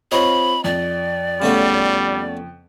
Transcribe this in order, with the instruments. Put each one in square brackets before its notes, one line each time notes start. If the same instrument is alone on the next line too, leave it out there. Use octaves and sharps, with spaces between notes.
[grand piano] C4 F4 C#5 [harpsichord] D#5 [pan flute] B5
[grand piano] F2 [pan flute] D5
[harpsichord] C#3 A3 B3 [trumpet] G3